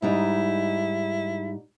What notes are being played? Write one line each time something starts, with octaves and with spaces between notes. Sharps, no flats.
G#2 G3 D#4 E4